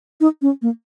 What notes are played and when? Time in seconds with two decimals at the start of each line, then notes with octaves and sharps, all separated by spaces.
0.21 D#4
0.42 C#4
0.62 A#3